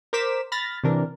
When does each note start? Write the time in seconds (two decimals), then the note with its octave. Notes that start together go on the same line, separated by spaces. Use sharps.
0.13 A#4 C5 D6 B6 E7
0.52 B5 F6 A6 A#6
0.84 C3 E3 D4 A#4